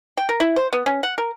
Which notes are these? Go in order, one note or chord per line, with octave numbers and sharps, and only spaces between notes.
G5
A#4
E4
C5
B3
C#4
F#5
A#4